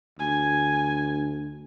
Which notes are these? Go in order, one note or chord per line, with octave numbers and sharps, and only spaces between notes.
D2 G#5